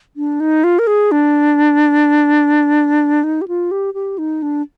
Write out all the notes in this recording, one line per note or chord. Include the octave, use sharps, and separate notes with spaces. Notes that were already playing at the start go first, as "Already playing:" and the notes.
D4
D#4
F4
A#4
G#4
D4
D#4
G4
F4
G4
G4
D#4
D4